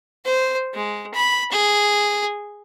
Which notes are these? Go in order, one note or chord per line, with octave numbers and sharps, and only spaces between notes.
C5
G#3
B5
G#4